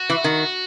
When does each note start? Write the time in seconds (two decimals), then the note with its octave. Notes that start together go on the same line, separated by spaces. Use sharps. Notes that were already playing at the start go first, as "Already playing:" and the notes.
Already playing: F#4
0.10 E3
0.24 D#3